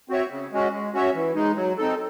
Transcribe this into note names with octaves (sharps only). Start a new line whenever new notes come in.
C4 F#4 C#5 E5
C#3
G#3 C#4 F#4
G#3
C#4 F#4 C#5 E5
E3
G#3 D#4
F#3
C4 D#4 A4